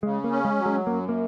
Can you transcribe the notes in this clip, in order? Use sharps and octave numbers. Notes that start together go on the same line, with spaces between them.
C#3 G#3
A#3
C#4
G#3
F#3
G#3
F#2 A#3
A#3